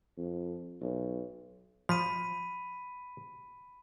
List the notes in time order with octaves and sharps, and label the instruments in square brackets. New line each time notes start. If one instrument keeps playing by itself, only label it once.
[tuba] F2
B1
[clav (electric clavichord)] F3 [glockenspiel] B5 B6 D#7